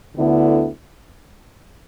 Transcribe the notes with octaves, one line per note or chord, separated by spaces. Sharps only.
D2 D3 B3 E4